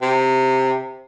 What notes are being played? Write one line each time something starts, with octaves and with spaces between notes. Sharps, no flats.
C3